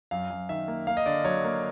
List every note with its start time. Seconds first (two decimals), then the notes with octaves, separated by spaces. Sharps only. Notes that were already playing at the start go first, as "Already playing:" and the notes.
0.11 F#2 F5
0.30 F#2
0.49 D#3 E5
0.68 A#3
0.87 A#3 F5
0.97 D#5
1.06 D3 D5
1.25 F#3 C#5
1.44 A#3